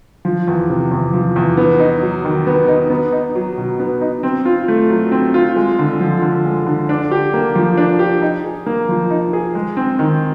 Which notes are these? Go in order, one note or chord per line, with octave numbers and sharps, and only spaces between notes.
F3
E2
C3
E2
F3
E2
B3
D#4
F#3
D#3
B3
D#4
B3
D#4
F#3
B2
B3
D#4
C4
F4
A3
F#3
C4
F4
G#3
D3
F3
D3
G#3
D3
D4
G4
A#3
F3
D4
G4
D#4
G#4
A#3
F3
D#4
G#4
G#3
C4
D#3